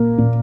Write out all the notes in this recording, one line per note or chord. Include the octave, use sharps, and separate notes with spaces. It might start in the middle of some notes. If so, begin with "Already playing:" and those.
Already playing: A#2 A#3 A#4
A#2